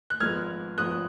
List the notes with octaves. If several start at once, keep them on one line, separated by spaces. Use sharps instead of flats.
F#6
G#1 G#2 F3 G#3 B3 F6 G#6
G#1 G#2 F3 G#3 B3 D#6 F#6